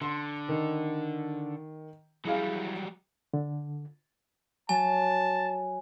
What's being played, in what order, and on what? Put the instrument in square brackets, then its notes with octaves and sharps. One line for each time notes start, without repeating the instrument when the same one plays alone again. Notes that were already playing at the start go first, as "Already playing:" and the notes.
[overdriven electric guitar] D3 [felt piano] C6
[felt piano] D#3
[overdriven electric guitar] F#3 G3 [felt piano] E4 G#4 F5
[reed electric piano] D3
[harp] F#3 [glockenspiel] G#5 [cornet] A5